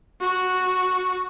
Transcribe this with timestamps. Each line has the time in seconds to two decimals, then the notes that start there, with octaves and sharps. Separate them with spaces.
0.20 F#4 C#6